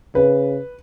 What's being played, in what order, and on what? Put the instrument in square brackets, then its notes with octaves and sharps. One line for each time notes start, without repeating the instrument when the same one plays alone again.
[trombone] C#3 [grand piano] B4